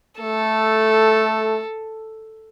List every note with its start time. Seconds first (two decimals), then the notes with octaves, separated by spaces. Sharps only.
0.20 A3 A4